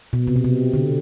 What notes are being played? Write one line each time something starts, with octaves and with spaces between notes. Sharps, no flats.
B2
C3
B2
C3
D3